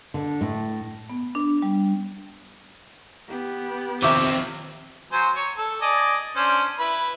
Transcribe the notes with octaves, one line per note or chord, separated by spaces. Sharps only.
D3
A2
B3
D4
G3
B3 G4
A#1 D#2 C3 F3 C4 E5 D6
F#3 C5 G#5
C#5
A4
D5 D#5 G#5
C#4 D4 C5
E4 B4